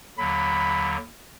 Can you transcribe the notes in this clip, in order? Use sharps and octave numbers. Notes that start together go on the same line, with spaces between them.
D#2 D3 F#3 B5